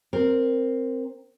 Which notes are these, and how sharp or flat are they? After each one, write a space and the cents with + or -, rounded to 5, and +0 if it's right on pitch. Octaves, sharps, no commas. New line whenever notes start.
C4 +5 A#4 +0